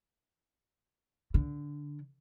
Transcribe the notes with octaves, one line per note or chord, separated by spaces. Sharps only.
D3